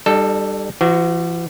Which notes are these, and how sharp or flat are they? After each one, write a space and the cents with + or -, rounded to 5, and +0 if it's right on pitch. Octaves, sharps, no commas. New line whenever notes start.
G3 +10 D#4 -40 A4 +0
E3 +45 F#4 +0